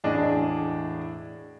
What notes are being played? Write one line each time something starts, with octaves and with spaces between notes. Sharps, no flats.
E1 A2 D4 G#4 D#5